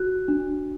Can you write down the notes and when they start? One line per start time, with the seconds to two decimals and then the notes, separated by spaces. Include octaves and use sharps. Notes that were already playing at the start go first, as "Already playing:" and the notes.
Already playing: F#4 F#6
0.28 D4